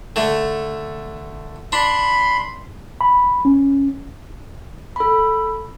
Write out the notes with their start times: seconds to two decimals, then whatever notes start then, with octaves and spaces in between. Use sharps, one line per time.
0.16 D3 A3
1.72 D4 B5 C6
3.01 B5
3.45 C#4
4.96 A4 B5